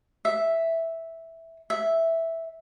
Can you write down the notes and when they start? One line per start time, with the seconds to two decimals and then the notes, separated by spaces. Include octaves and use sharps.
0.25 E5
1.70 E5